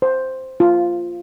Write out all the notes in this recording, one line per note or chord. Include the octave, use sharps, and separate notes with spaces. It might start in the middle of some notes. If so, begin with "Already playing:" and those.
C5
F4